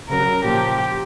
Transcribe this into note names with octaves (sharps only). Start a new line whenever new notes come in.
C#3 F#3 A#4
A#2 F3 G4